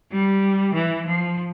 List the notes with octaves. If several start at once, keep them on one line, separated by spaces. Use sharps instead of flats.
G3
E3
F3